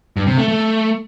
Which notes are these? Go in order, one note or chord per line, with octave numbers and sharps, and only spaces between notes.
G2
C3
A3
A3